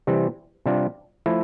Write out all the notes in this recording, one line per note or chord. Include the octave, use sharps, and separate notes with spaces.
C3 E3 G3 C4
C3 G3 D4 F4
F3 A3 E4